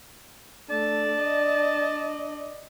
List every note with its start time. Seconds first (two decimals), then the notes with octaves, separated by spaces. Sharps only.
0.70 A3 D4 D5 A5
1.21 D#5